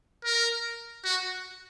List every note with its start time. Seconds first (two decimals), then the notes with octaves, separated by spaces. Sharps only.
0.25 A#4
1.04 F#4